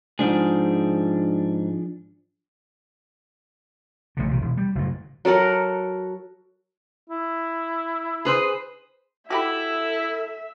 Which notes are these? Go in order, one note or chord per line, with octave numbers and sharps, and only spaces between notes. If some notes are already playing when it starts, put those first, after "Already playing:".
G#2 F3 D4 G#4
A1 D3
B1 D#3
E1
G3
F#1 A2
F#3 A4 A#4 F#5
E4
G#4 B4 C5
E4 F#4 G4 A4 E5 B5